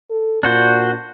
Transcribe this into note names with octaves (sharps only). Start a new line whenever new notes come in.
A4
A#2 D4 F#4 C5